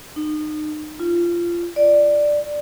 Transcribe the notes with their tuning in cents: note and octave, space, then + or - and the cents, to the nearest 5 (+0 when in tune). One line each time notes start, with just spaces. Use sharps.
D#4 -30
F4 -20
D5 +5